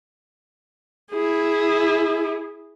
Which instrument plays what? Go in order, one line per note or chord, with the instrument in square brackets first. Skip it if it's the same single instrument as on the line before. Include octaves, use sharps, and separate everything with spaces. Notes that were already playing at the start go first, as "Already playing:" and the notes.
[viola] E4 G#4